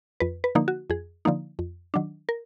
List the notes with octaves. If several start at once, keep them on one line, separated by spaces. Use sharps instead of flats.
F2 B4
B4
D3 F3 A#3 D#4
F#4
F2 G#4
D3 F3 A#3 D#4
F2
D#3 F#3 D4
A#4